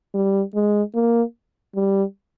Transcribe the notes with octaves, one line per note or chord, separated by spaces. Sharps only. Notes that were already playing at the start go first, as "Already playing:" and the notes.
G3
G#3
A#3
G3